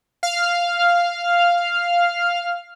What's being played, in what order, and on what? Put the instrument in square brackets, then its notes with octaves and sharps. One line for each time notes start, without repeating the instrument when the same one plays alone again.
[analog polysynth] F5 F6